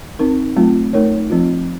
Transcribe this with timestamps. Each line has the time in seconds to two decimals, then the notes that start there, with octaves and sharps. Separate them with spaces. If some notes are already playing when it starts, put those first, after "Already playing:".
0.19 C4 D#4 A#4
0.56 F#3 A3 C4 F4
0.93 A3 D#4 A#4 C#5
1.30 F3 C4 F4